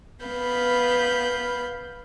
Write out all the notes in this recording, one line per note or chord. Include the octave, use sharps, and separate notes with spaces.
B3 F5 B5 G6